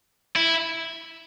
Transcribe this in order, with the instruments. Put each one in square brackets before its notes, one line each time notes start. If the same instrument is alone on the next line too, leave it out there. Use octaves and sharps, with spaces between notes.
[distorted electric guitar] E4